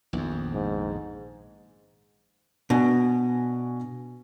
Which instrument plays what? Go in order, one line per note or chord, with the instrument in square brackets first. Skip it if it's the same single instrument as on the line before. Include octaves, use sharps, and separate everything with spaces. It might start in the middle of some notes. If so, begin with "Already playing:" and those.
[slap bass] A#1 F2 [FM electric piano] D#3 B3
[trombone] G#2
[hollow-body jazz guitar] B2 [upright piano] D4 F#4 G#5